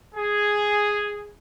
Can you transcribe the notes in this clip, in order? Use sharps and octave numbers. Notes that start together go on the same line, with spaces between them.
G#4